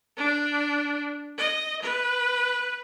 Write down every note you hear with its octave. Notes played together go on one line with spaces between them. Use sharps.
D4
D#5
B4